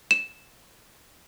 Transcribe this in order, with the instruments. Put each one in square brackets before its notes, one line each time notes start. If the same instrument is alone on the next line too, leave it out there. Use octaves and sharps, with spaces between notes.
[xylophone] E7